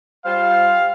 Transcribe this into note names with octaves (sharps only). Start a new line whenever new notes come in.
G3 F4 C5 F5